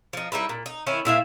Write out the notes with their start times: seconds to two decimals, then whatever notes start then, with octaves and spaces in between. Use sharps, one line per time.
0.13 F3 D#4
0.32 G3 D#4 E4 B4
0.49 A#2
0.66 D#4
0.86 D#3 C#4 E4
1.05 A#2 E4 E5 F5